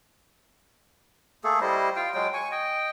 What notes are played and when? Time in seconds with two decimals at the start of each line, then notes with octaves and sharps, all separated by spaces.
1.44 A3 A#3 G#4 A4
1.61 G3 E4 C5 D#5
1.96 F4 F5 G5
2.14 F#3 G#3 G5
2.33 G#5 C#6
2.51 D#5 G5